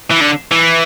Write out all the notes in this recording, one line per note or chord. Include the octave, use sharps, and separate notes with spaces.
E3
D3
E3